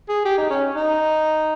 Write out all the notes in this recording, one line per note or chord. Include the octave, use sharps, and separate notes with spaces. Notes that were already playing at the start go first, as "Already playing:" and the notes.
G#4
G4
D#4
C#4
D#4